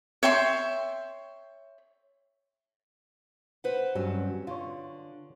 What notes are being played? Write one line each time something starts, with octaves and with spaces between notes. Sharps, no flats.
C#5 E5 G5 C6
B4 C5 F#5
G2 F#3 C4 C#4
D3 F4 C#5